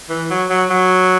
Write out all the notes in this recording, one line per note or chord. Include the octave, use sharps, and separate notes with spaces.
E3
F#3
F#3
F#3